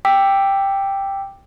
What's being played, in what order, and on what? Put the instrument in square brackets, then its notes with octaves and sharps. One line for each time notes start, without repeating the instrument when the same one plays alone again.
[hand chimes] G5 D6 E6 B6